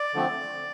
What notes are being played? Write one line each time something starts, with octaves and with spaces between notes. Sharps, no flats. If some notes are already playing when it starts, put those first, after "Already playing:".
Already playing: D5
D3 F3 A3 C4